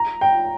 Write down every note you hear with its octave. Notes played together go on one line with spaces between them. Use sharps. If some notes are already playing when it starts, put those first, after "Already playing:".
Already playing: A#5
G5